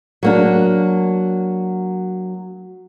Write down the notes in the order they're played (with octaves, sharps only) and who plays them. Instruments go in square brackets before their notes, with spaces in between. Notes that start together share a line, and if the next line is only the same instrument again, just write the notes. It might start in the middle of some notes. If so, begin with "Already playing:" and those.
[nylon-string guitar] F#3 A#3 D4